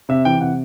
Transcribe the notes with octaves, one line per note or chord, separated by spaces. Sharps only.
C3 E5
E3 G5
C3 F#5